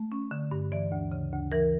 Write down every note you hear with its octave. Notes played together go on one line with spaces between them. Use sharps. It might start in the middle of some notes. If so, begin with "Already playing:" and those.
Already playing: A3
C#4
D3
G2
E3 D5
D2
C#3
D2
E3 A#4